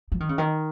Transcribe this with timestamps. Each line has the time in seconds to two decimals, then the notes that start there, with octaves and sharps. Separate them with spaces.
0.12 F3
0.20 D#3
0.29 C#3
0.38 D#3